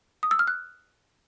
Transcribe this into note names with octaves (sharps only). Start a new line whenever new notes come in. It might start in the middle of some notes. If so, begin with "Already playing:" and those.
D#6
E6
F6
F#6